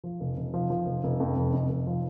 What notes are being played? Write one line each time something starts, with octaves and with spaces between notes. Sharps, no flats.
F3
F1
F1
F3
F3
F1
F1
F2
F1
F1
F1
F3